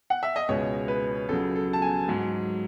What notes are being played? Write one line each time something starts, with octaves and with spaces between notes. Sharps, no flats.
F#5
E5
D#5
C#2 B2 G#3 C#5
B4
C#2 C#3 F#3 A4
A4
A5
G#5
G#2 F#3